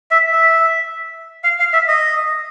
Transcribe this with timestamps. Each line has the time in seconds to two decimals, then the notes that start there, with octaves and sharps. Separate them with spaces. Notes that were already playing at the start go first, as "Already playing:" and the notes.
0.11 E5
0.33 E5
1.44 F5
1.60 F5
1.73 E5
1.88 D#5